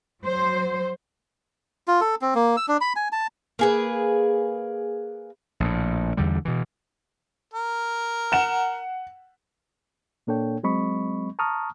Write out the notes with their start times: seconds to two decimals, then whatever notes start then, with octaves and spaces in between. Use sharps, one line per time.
0.21 F#3 C5
1.88 F4
2.01 A4
2.22 C4
2.35 A#3
2.57 E6
2.68 D4
2.81 B5
2.96 G#5
3.12 A5
3.59 A#3 G#4 B4
5.60 A#1 A2
6.17 E2 D3 G3
6.45 B2 E3
7.54 A#4
8.32 F#5 E7
10.27 A#2 A#3 D4 A4 C#5 G5
10.63 F#3 G#3 C4 D#5 B5 C#6
11.39 A5 A#5 C#6 D#6 F6